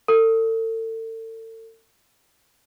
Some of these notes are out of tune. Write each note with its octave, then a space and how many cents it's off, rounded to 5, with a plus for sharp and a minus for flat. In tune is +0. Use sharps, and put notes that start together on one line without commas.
A4 +35